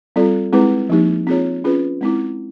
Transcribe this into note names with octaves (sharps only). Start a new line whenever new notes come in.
G3 C4 F4 A4 D5
G#3 C4 E4 G#4 B4
F3 A#3 D#4 G4
C4 F4 G#4 C#5
C#4 F4 G#4 B4
G#3 C4 E4